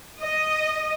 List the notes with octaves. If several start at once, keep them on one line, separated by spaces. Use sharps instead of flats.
D#5